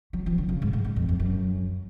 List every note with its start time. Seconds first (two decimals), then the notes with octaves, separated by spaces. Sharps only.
0.13 F#3
0.26 F3
0.38 D3
0.49 C#3
0.62 G#2
0.73 A2
0.85 G#2
0.96 F2
1.09 F2
1.20 F#2